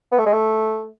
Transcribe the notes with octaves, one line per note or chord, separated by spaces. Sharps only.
B3
A3
G#3
A3